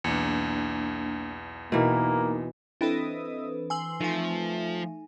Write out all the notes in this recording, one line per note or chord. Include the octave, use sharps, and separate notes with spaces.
B1 E2 A#3 D4
B2 E3 A#3 D#4 A#4
E3 C4 D4 A4 B4 D#5 E5 D#6
G#5 C6 E6 F#7
F3 A3 D#4 G#5